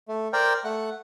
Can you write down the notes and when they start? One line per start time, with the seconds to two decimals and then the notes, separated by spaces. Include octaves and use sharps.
0.08 A3
0.33 A#4 C5 D5 G5
0.64 A3 F#5